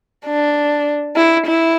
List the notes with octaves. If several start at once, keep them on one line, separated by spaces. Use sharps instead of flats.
D4
E4
E4